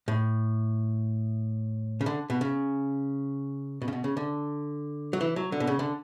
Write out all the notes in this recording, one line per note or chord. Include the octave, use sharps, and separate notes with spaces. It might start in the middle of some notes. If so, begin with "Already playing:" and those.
A2
C#3
D3
B2
C#3
B2
C#3
B2
C#3
D3
F#3
E3
F#3
D3
B2
C#3
D3